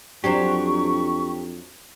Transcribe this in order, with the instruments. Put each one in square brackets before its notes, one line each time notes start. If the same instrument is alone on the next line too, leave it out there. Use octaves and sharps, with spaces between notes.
[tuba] F2 [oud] F#3 D4 C5 [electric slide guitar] G4 [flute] C#6